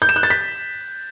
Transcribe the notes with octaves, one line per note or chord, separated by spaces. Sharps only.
G6
E7
F#6
A6
B6